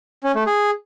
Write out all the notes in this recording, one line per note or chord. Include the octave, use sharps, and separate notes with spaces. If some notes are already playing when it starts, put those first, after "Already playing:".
C#4
A3
G#4